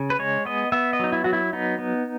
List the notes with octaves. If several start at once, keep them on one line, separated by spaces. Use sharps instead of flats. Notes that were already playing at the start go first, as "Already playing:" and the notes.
Already playing: C#3
B4
G#3 C#5
B3 D#5
B3 E5
D#5
F#3 D#4
E4
F#3 F#4
E4
B3 D#4
B3